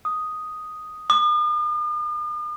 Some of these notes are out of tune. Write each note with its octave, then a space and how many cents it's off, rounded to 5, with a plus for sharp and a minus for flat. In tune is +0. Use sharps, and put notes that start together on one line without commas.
D#6 +0
D#6 -45